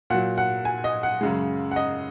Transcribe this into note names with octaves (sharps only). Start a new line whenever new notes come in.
A#2 F#3 F#5
F#5
G#5
D#5
F#5
F#2 C#3 G#3
F#5
D#5